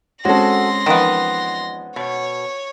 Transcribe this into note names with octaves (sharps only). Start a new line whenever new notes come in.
G#3 C4 C#4 F#4 A4 C6 A#6
E2 D#3 F3 B3 D#5
B2 C#5